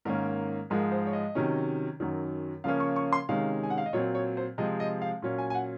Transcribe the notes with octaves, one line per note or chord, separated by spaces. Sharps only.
G#2 D#3 A#3 C#4 A#4
G#2 F3 G#3 A#4
C5
C#5
D#5
C3 D#3 F#3 C#4
F#2 D#3 F#3
C#3 F3 A#3 C#4 F5
C#6
C#6
C6
C3 D#3 G#3 C#4 F5
G#5
F#5
F5
D#5
A#2 F#3 C4 C#5
C#5
C5
C3 F3 G#3 C4 D#5
D#5
F5
A#2 F#3 C#4
G#5
G#5
F#5